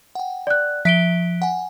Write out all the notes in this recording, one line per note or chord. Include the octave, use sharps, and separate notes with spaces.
F#5 G5
D5 F#6
F3 E5 F#6 B6 D7 G7
F#5 G#5